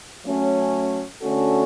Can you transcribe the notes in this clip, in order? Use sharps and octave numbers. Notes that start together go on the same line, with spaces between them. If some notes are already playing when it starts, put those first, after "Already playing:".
F#3 A3 C#4
D3 A3 C#4 F#4 A4